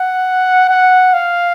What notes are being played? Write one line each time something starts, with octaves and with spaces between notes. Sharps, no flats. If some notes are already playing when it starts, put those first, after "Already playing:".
Already playing: F#5
F#5
F5